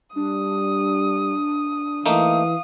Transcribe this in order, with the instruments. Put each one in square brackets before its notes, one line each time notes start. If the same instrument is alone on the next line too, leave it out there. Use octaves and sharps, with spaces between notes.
[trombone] G3 [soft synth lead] D4 [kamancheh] D#6
[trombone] E3 [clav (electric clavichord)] A3 A#3 D#4 [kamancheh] F5 D#6